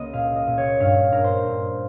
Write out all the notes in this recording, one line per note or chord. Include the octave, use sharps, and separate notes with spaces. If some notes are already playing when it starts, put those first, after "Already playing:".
Already playing: C#2 A#3 D#5
A#2 F5
D#5
A#2
C#5
G2 F5
G2 A#4
C5
G2